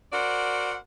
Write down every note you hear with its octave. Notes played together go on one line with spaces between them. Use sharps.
F#4 A#4 C5 D5 F#5